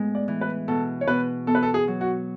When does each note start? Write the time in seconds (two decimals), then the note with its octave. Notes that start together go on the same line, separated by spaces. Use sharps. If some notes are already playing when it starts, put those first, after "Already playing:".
Already playing: A2 G#3 B3
0.15 D5
0.28 E3
0.41 B4
0.68 B2 A4
1.01 C#5
1.08 B2 B4
1.47 B3 A4
1.55 B4
1.63 A4
1.74 G#4
1.88 F#3
2.01 F#4